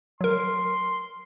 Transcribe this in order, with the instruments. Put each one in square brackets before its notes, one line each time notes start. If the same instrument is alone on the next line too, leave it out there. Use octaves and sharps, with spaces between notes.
[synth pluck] F#3 A#4 [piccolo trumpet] C6